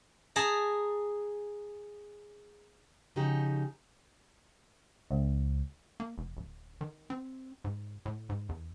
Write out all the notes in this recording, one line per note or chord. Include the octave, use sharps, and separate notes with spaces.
G#4 A5 A#5
C#3 F3 D#4 F#4 G4
C#2
A#3
F1
D1
D#3
C4
G#2
A2
G#2
E2